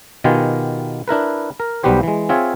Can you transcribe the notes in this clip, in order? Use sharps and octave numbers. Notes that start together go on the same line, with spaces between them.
B2 D#3 B3 F4 G4 G#5
D4 E4 A#4 B4
A#4
B1 G3 B3 F#4 G4 C5
E3 G#3
C4 F4 G#4 C#5 E5 G#5